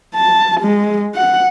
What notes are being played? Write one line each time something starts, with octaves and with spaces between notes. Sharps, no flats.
A5
G#3
F#5